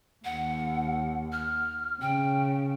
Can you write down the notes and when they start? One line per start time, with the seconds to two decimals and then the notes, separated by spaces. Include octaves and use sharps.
0.25 D#2 F#5
1.32 F6
2.02 C#3 G5